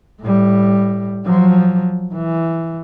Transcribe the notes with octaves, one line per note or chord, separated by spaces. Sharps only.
A2 G3
F3 F#3
E3